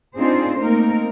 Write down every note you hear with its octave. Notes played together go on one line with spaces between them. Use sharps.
C4 D4 D#4 F4 G#4 C5
A3 A#3 C4 D#4 A#4